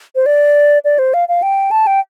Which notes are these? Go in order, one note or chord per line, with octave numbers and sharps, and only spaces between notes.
C5
D5
D5
C5
F5
F5
G5
A5
G5